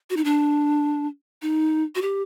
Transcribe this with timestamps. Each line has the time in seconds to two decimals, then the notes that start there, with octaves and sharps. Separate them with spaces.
0.10 F#4
0.17 D#4
0.24 D4
1.42 D#4
1.95 F#4
2.02 G4